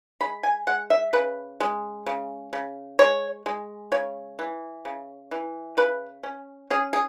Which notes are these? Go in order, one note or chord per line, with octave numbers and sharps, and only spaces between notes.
G#3 B5
G#5
G#3 F#5
E5
C#3 B4
G#3
C#3
C#3
G#3 C#5
G#3
C#3 C#5
E3
C#3
E3
C#3 B4
C#4
C#4 G#4
G#4